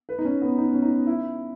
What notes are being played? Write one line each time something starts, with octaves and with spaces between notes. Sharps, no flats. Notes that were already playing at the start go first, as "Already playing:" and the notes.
B4
D#4
C#4
B3
D#4
C#4
D#4
E4